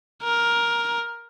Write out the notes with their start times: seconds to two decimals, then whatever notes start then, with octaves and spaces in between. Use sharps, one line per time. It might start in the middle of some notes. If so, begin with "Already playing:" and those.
0.23 A#4